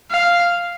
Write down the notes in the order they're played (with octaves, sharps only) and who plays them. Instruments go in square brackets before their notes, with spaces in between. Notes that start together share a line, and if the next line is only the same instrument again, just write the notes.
[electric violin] F5